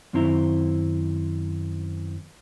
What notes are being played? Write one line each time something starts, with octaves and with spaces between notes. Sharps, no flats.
F#2 D#3 C4 E4 C5 A#5